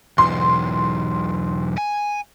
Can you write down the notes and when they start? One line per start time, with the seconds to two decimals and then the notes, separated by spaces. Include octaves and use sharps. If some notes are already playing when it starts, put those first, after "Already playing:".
0.18 B1 E2 C6
1.78 G#5